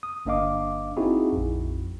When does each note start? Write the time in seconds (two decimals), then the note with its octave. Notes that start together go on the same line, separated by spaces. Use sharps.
0.03 D#6
0.26 G1 A#3 D4 D#5 F5 D6
0.97 C4 D#4 E4 F#4 G#4
1.33 A#1 F2